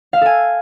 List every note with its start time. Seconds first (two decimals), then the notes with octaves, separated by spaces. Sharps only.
0.13 F5
0.17 E5
0.21 A4
0.26 G#5